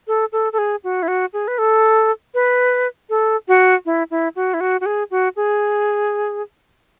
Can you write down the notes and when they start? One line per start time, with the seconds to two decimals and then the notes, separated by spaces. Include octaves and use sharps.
0.07 A4
0.32 A4
0.53 A4
0.58 G#4
0.84 F#4
1.03 E4
1.08 F#4
1.33 G#4
1.48 B4
1.58 A4
2.34 B4
3.10 A4
3.48 F#4
3.86 E4
4.11 E4
4.36 F#4
4.54 E4
4.61 F#4
4.81 F#4
4.86 G#4
5.11 F#4
5.36 G#4